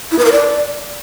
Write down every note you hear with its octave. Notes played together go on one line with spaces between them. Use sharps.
E4
B4
A#4
D5